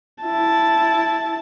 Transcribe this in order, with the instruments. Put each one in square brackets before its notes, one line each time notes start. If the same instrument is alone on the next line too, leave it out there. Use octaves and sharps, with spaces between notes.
[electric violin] E4 A5